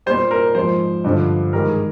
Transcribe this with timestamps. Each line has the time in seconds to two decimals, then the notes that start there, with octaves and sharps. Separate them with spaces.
0.06 A#2 G3 C5
0.31 A#4
0.55 G#2 F3 C5
1.04 G2 D3 F3
1.53 G#2 D#3 G3 A#4
1.69 G#4